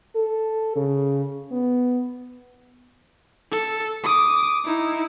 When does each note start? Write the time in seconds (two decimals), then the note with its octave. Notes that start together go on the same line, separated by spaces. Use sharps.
0.15 A4
0.76 C#3
1.52 B3
3.51 A4
4.03 D6 D#6
4.64 D#4 E4